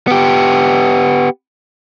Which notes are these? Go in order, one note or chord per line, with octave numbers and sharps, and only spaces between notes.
B3 G4